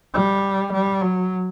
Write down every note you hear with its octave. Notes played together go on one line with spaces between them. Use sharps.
G3
G3
F#3